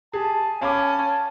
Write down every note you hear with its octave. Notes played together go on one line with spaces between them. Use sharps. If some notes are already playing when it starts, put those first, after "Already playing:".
G4 G#4 G#5 A5
C#4 F5 A5 B5 D6